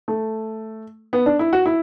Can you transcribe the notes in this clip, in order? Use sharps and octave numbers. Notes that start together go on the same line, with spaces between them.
A3
B3
D4
E4
F#4
E4